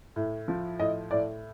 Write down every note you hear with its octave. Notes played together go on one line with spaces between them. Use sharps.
A2
F3
A2 D#5
A2 D5